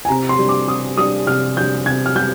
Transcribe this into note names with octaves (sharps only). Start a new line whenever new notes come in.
G#5
C3 A#5
C6
G3 D4
D6
C3 D#6
G3 D4 D#6
C3 F6
G3 D4 G6
C3 G#6
F6
G3 G6